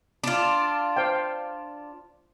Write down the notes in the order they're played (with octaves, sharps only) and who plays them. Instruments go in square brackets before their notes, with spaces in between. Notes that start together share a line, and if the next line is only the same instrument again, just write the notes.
[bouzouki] D4 F4
[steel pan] C5 F5 G5